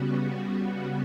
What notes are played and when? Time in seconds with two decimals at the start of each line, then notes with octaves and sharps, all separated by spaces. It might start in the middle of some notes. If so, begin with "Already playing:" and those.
Already playing: C#3 G3 B3 F#4
0.45 F#4